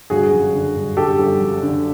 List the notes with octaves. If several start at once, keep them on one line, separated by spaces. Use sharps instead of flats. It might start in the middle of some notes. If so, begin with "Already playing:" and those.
G1 F#4 G#4
F#2
D3
G1
G1 G4 A4
G1
F#2
D3